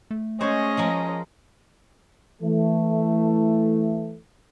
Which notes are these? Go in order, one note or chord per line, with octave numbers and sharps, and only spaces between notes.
A3
G#3 C#4 C5 C#5 D#5
F3 G#3 A#4
E3 A3